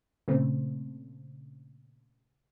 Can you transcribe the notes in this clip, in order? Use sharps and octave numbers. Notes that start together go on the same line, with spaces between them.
A#2 C#3 A3 C4